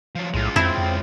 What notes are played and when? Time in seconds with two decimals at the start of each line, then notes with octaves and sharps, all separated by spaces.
0.15 F3 F#3
0.34 B1 A2 G#3 F4
0.56 F2 C4 E4
0.78 F2